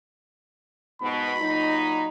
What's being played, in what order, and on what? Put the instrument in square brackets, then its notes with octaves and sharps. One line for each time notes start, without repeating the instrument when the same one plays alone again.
[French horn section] G#2 B2 [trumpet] B5
[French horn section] A#2 F#3 D#4